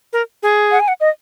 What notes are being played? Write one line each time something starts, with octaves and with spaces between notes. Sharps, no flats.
A#4
G#4
F#5
G#5
F#5
D#5